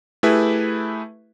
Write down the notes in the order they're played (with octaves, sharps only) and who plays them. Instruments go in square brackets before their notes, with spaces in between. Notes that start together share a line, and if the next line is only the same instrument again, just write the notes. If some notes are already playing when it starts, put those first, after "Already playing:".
[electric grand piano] A3 E4 G4 G#4 B4 E5